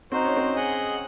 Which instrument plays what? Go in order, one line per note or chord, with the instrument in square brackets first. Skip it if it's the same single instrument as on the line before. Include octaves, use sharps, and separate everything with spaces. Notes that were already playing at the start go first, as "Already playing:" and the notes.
[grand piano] C4 [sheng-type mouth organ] D#4 F#4 C5
[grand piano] C#4
C4
[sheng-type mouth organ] G#4 D#5 F#5